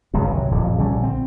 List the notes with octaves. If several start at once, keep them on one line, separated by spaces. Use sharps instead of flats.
G#1 C#2 G2 B2
C3 F#3
D1 F2 A#2
A#1 D3 G3 C#4
C4